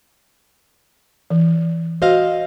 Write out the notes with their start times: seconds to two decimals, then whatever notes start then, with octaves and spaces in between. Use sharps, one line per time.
1.30 E3
2.02 F#4 C5 D#5 F5